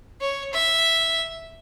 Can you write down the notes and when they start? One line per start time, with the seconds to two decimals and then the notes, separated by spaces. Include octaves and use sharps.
0.21 C#5
0.53 E5